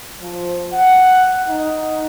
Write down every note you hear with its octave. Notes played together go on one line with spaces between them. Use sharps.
F3
F#5
D#4